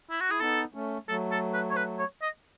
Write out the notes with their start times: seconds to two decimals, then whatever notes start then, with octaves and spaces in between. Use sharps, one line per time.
0.10 E4
0.21 F#4
0.30 E4 G#4
0.40 B3 D#4 A4
0.74 A3 C#4
1.08 F#3 A3 A4
1.31 A4
1.53 B4
1.70 C#5
1.76 B4
1.99 C#5
2.22 D#5